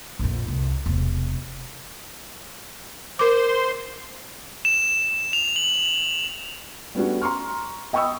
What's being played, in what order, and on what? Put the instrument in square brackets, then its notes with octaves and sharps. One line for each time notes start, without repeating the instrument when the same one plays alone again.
[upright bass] A#1 F2
C2
E1 C3
[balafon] A#4 D6 [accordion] C5 C6
[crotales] E7
F7
F#7
[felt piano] G3 A3 B3 C#4 D4 F#4
A#5 C6 C#6 F6
D#5 G5 B5 C#6 D#6 E6